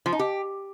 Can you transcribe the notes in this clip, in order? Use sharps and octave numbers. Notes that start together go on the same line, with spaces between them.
F3
D#4
G4